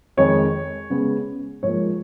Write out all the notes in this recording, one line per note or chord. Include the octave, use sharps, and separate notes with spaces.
F2 D#3 G#3 C#5
C#3 G#3 B3
G#2 F3 A#3 C#5